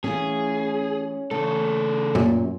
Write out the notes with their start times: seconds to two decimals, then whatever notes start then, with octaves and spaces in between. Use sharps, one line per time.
0.04 E3 A3 C#4 F4 G#4
1.31 C#3 A3 A4
2.15 F#2 A#2